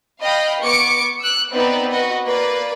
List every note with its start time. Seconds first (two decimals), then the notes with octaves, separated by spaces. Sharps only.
0.21 D#5 F5 G5 B5
0.61 B3 C#6 D6 C#7 D7
1.20 E6 F#6
1.52 B3 C4 D#4 B4 D5
1.90 F#4 B4 D#5
2.24 A#3 B4 D5